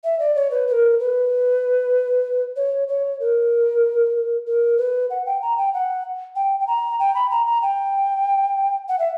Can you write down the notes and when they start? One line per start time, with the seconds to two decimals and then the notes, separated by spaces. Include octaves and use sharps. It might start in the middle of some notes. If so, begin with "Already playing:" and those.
0.04 E5
0.19 D5
0.36 C#5
0.51 B4
0.67 B4
0.72 A#4
0.99 B4
2.56 C#5
2.88 C#5
3.20 A#4
4.47 A#4
4.78 B4
5.10 F#5
5.26 G5
5.42 A#5
5.58 G5
5.74 F#5
6.36 G5
6.60 G5
6.67 A#5
6.99 G5
7.15 B5
7.31 A#5
7.46 A#5
7.62 G5
8.89 F#5
8.99 E5